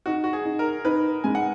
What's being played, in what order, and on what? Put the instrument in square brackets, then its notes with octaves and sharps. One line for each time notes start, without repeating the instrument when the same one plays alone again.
[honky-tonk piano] D#4 [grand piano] F#4
[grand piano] F#4
G#4
[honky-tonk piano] D#4
[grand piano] A#4
[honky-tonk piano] D#4 [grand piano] B4
[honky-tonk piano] G#3 [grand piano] G#5
[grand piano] F#5